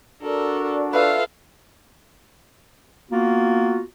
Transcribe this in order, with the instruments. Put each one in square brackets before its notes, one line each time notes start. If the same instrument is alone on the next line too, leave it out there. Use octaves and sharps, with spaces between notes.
[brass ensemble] D4 F#4 D5 [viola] A4 A#4
[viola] F4 A4 [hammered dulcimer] B4 E5 [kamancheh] F5
[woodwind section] A#3 B3 F4 F#4